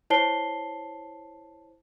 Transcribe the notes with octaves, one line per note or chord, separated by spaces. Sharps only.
E4 C5 C#5 A5 C7 G7